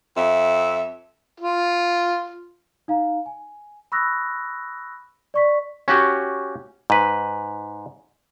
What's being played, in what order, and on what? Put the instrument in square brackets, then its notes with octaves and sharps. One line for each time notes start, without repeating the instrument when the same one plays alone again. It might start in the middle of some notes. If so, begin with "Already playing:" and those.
[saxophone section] F2 E5
[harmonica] F4
[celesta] D#4 F5 A#5
G#5
B5 C#6 D#6 E6 F#6 A#6
D5 C#6 B6
[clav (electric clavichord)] C#4 F#4 G4
G#2 B4